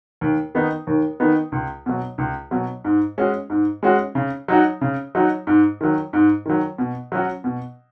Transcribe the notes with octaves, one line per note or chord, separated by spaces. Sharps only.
D#2
D#3 B3 D#4
D#2
D#3 B3 D#4
C#2
B2 F#3
C#2
B2 F#3
G#2
G#3 C#4 F#4
G#2
G#3 C#4 F#4
C#3
F#3 D#4 F#4
C#3
F#3 D#4 F#4
G#2
D#3 F#3
G#2
D#3 F#3
B2
F#3 C#4 F#4
B2